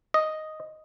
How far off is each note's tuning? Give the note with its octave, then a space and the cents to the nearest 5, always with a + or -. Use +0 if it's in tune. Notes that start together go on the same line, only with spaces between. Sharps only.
D#5 +0